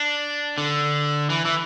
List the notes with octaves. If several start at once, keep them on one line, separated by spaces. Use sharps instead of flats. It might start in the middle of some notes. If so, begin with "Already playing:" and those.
Already playing: D4
D3
E3
E3